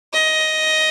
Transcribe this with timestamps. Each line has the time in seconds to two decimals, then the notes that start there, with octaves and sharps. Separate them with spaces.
0.13 D#5